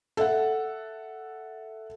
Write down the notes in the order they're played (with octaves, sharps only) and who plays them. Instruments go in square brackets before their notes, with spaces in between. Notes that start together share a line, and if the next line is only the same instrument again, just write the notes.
[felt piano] A4 E5 F#5